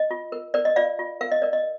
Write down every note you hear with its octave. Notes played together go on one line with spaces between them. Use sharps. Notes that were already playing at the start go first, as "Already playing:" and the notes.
Already playing: D#5
F4
A#4
A#4 D5
D#5
F4 D5 F5
F4
A#4 F5
D#5
A#4 D5
D#5